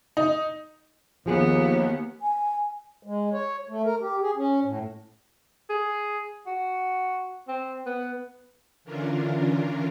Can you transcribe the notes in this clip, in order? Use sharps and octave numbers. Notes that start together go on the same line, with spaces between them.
D#4
D#2 F3 B3 G#4
G#5
G#3
C#5
A3
A#4
G4
G#4
C#4
A2
G#4
F#4
C4
B3
D3 E3 C#4 D4 F4 A#4